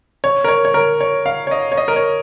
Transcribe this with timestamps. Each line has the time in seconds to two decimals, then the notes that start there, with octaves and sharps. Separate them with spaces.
0.24 C#5
0.44 A#4
0.48 C#5
0.65 C#5
0.74 A#4
1.01 C#5
1.26 F5
1.47 C#5
1.51 D#5
1.72 C#5
1.77 D#5
1.88 A#4
1.96 C#5